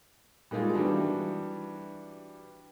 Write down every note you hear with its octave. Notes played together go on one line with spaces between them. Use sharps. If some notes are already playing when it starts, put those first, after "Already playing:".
G3 G#3 A#3 D#4 F4 G#4
E3 G3 D4 F#4